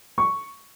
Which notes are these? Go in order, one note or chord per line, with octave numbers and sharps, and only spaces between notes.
C#6